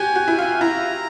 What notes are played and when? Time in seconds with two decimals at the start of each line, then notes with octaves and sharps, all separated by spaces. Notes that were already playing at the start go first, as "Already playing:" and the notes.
Already playing: F#4 G4 G#5
0.16 F#4
0.28 E4
0.38 F4
0.61 E4 A#5